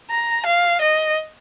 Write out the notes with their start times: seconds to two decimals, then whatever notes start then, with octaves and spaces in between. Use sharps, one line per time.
0.11 A#5
0.46 F5
0.81 D#5